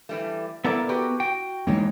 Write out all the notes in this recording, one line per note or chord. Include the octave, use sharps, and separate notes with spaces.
E3 G3 A3
A#2 B3 E4 A4 A#4 D5
F#4 G4 B4
F#4 G5
E3 G#3 A#3 D4 D#4 C#5